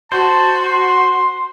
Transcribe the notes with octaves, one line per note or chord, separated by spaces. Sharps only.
F#4 C5 A5
C6